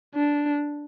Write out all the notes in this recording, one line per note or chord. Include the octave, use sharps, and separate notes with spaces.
D4